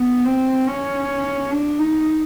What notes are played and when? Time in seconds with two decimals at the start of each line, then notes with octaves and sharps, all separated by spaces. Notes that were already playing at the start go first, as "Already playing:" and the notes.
Already playing: B3
0.24 C4
0.67 C#4
1.51 D4
1.79 D#4